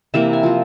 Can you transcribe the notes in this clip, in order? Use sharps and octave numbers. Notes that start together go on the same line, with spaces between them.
C3 E3 A#3 E5
G#5
F3 C4